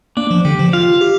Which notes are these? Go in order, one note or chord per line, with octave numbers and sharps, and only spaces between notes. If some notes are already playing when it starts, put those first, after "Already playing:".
A#3 D4
F3
D3 G4
F3
F4 F5
G4